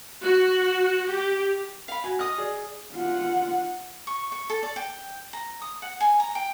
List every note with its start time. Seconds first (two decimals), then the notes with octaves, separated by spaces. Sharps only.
0.23 F#4
1.09 G4
1.88 F5 B5
2.04 F#4 G#5
2.19 D#5 D#6 F6
2.38 G#4 D5
2.93 F4 F#5
4.07 C#6
4.32 C#6
4.50 A4
4.63 D5
4.76 G5
5.33 A#5
5.62 D#6
5.82 F#5
6.00 G#5
6.20 A#5
6.35 G5